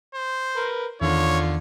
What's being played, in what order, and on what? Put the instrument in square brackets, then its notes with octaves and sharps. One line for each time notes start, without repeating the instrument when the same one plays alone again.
[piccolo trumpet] C5
[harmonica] A#4 B4
[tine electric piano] E2 D#3 [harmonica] D3 F4 [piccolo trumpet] C#5